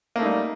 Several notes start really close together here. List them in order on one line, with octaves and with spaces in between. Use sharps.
A#3 A3 D#4 G3